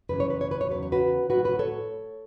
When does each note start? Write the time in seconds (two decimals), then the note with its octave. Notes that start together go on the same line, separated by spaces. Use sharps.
0.09 F#2 C#3 E3 B4
0.20 C#5
0.30 B4
0.41 C#5
0.51 B4
0.61 C#5
0.69 E2 C#3 F#3 B4
0.83 C#5
0.92 F#4 B4
1.30 A2 F#3 F#4 B4
1.45 F#4 B4
1.59 A4 C#5